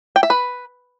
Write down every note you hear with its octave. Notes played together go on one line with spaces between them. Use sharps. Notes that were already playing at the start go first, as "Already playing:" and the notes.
G5
E5
B4